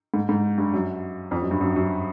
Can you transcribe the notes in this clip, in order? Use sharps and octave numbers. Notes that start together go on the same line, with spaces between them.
G#2
G#2
G2
F#2
F2
F#2
G2
F#2
F#2